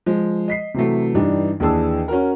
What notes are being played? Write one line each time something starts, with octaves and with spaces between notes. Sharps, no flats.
F3 G#3
D#5 B6 C7
C3 E3 F#3 A3
G2 E3 D4 D#4 G4
D#2 E3 D4 G#4 A5 E6
C#4 F#4 A#4